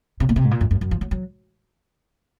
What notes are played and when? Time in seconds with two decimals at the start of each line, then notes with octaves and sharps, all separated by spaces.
0.20 C3
0.29 A#2
0.36 C3
0.44 G#2
0.51 A#2
0.61 F#2
0.71 F#2
0.81 F#2
0.91 F3
1.01 F#3
1.11 F#3